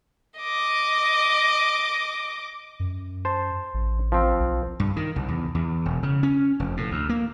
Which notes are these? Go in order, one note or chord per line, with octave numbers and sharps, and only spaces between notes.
D#5 D6
F#2
C5 A5
A1
F3 C4
B1
G2
D#3
C2
E2
E2
E1
C#3
C#4
F1
A2
D2
A#3